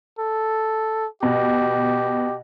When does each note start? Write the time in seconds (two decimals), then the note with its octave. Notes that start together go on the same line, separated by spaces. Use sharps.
0.19 A4
1.23 B2 G4